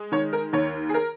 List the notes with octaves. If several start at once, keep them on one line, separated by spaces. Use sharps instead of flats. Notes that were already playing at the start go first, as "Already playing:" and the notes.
Already playing: G#3
D#3 C#5
A#4
D#2 C#5
G#4
A#4